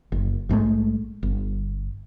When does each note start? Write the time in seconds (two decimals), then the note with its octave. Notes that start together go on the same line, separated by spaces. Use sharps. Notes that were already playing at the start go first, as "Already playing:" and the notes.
0.12 F#1
0.49 A#1 G#2 G#3 A3
1.23 G1